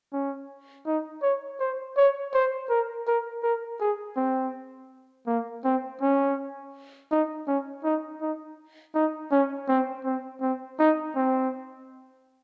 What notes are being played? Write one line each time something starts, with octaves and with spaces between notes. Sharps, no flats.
C#4
D#4
C#5
C5
C#5
C5
A#4
A#4
A#4
G#4
C4
A#3
C4
C#4
D#4
C#4
D#4
D#4
D#4
C#4
C4
C4
C4
D#4
C4